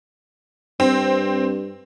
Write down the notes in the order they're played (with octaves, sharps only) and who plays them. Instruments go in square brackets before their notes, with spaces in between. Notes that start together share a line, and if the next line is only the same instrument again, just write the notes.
[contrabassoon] G2 [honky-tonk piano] C4